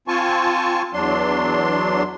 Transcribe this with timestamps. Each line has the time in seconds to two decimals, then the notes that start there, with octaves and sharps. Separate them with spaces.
0.08 C4 F4 G#5 A5 C#6
0.93 E2 F#3 D4 C6